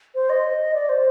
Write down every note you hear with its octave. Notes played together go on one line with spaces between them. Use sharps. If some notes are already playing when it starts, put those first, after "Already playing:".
C5
D#5
D5
C5